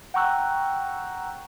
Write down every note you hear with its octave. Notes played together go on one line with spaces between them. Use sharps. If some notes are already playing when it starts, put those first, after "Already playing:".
F#5 G5 A#5 C#6 E6 F#6